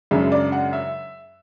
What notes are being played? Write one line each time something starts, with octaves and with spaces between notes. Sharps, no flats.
F#2 C#3 G#3 D4 E5
D5
F#5
E5